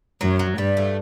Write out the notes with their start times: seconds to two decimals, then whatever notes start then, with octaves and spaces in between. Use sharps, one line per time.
0.21 F#2 F#3
0.39 F#3
0.58 G2 G3
0.77 A3